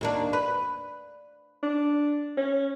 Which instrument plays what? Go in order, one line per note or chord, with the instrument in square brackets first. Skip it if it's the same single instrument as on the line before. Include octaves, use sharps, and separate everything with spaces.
[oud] D#2 A#3 D4
B4
[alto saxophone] D4
C#4